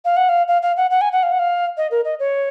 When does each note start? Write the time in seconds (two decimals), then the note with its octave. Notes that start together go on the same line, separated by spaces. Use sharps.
0.05 F5
0.17 F#5
0.29 F5
0.48 F5
0.62 F5
0.77 F#5
0.90 F#5
1.01 G#5
1.12 F#5
1.23 F5
1.32 F#5
1.39 F5
1.77 D#5
1.91 A#4
2.05 D#5
2.19 C#5